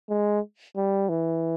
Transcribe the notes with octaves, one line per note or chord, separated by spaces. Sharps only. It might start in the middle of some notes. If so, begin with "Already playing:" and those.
G#3
G3
E3